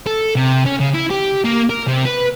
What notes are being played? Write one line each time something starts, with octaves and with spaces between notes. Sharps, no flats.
A4
C3
C#4
C#3
E4
G4
A#3
A#4
C3
B4